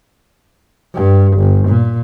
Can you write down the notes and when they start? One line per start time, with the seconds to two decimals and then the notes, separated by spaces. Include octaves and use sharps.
0.95 G2
1.37 G1
1.68 A#2